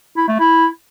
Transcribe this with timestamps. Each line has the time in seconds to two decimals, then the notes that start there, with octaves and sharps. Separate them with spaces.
0.17 E4
0.28 A3
0.40 E4